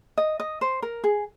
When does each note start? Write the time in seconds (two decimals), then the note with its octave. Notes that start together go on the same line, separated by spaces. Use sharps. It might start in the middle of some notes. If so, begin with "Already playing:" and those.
0.18 D#5
0.40 D#5
0.61 C5
0.82 A#4
1.04 G#4